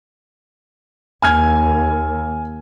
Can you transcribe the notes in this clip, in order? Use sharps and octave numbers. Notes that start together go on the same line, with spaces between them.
D#2 G#5 F6 G#6